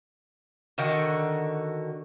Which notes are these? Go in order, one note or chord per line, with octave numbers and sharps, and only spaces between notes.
D3 D#3 F#4